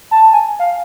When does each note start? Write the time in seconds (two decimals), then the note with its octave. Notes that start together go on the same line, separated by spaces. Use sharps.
0.11 A5
0.33 G#5
0.59 F5